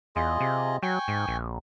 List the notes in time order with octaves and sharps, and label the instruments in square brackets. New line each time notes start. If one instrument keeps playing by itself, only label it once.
[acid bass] E2 [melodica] F4 G#4 D#5
[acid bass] C3
[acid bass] F#3 [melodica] G5 G#5 C#6
[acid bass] G#2
A#1